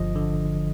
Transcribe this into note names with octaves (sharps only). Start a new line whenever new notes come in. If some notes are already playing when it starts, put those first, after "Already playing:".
Already playing: G1 F3 D#5
D3